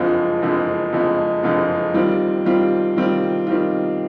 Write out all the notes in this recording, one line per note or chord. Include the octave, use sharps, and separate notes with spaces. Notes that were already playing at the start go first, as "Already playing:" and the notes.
Already playing: F#1 F2 D3 F3 G#3
F#1 F2 D3 F3 G#3
F#1 F2 D3 F3 G#3
F#1 F2 D3 F3 G#3
D#3 G3 C4 F4
D#3 G3 C4 F4
D#3 G3 C4 F4
D#3 G3 C4 F4